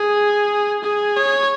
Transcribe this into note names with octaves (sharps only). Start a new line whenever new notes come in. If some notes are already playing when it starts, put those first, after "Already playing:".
Already playing: G#4
G#4
C#5